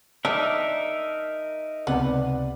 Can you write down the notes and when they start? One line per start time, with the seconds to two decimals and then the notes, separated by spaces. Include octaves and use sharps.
0.25 D4 D#4 A#4 E5
1.87 C#2 C3 B3 D5